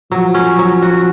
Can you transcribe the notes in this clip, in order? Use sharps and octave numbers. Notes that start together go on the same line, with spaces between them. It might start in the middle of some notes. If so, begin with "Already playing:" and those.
F3 F#3
C#4
F#3
F#4